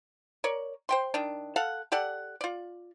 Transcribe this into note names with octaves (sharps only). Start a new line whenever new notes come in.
A#4 C#5 D5
C5 G5 C6
D#3 D4
A4 F5 F#5
G4 A4 D5 F#5
F4 D5